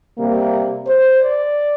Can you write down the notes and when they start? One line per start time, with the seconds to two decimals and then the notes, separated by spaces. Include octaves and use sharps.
0.18 C3 G3 A#3
0.87 C5
1.21 D5